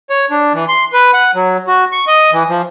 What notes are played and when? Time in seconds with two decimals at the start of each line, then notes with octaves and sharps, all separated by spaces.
0.10 C#5
0.30 D4
0.54 E3
0.68 C6
0.93 B4
1.14 F#5
1.35 F#3
1.67 F#4
1.92 C#6
2.07 D#5
2.32 E3
2.49 F3